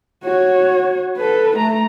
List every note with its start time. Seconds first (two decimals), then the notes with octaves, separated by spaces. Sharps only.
0.24 F#4 C#5
1.17 A4 B4
1.57 A3 A#5